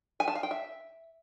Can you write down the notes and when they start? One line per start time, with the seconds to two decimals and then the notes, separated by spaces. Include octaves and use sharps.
0.20 G#5
0.28 A5
0.35 F5
0.43 G5
0.51 E5